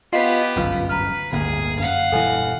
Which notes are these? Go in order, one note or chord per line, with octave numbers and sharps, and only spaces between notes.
B3 F4 G4 D#5 F5 C7
G1 C2 F#2 A2 F4 B4 F5
B4 A#5 F6
D1 G1 D2 A#3 G#4
F#2 F5 F#5
D#1 E3 A4 G#5